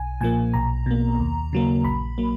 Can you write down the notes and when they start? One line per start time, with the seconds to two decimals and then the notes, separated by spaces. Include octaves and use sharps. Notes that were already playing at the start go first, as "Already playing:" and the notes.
Already playing: B1 G#5
0.21 A#2 F3 A#3 G#5
0.54 B1 A#5
0.86 B2 A#3
1.20 D#2
1.53 C#3 F#3 A#3
1.84 A#1 B5
2.18 F#3 A#3